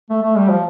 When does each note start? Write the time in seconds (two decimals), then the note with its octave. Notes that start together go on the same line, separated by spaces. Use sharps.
0.10 A3
0.22 A3
0.36 G3
0.49 F3